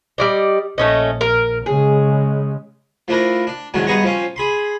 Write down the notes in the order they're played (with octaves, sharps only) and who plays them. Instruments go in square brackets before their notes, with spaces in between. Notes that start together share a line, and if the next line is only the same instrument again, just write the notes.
[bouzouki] G3 D5 D#5
[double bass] A#1 [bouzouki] A3 C#4 D#5
[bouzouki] A#4
[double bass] C#3 G#3 [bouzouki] G#4
[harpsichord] F3 A3 D4 E4 A#4
D4
E2 G#2 D#3 F#3 D4
G2 B3 D#4 G#4 A#5 C#6
F3 C4 C#4
G#4 B5 C6